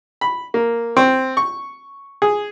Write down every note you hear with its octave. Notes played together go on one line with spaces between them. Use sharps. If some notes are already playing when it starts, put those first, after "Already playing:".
B5
A#3
C4
C#6
G#4